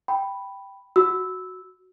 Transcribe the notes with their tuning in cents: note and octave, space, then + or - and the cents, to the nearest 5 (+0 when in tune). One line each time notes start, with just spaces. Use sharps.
G5 +0 B5 +0
F#4 +0 E6 -10